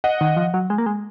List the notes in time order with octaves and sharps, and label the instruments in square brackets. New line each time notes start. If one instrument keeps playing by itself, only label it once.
[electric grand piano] D#5 F#5
[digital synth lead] D#3
F3
F#3
G#3
A#3
G#3